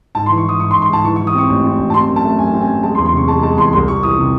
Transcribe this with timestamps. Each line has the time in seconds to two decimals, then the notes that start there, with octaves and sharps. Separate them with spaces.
0.15 G#2 A5
0.26 C6
0.30 E3
0.38 C#6
0.45 E3 D#6
0.60 G#2 C#6
0.71 C6
0.75 G#2
0.82 C6
0.90 G#2 A5
1.04 E3 C#6
1.16 C#6
1.19 E3
1.27 D#6
1.35 C4 C#6
1.49 A1
1.64 C4
1.79 A1
1.90 A5
1.93 C4 C6
2.09 F#2
2.16 A5
2.24 A3
2.39 F#2 G#5
2.54 C4
2.61 G#5
2.69 F#2
2.83 G#3 A5
2.95 C6
2.98 E2
3.06 C6
3.13 C3 C#6
3.28 G#3 A5
3.43 G#3 A5
3.58 E2 C6
3.73 C2 C6
3.88 C2 C#6
4.03 E3 D#6
4.18 C3